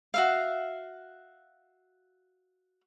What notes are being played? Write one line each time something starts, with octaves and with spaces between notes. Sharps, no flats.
F#4 E5 F5